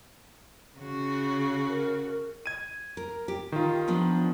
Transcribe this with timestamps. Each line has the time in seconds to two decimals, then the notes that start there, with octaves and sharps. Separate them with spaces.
0.78 C#3 F#4
1.69 A#4
2.46 G#6 D#7
2.97 A#4
3.28 G4
3.52 D#3 F4
3.88 F3 B3 D4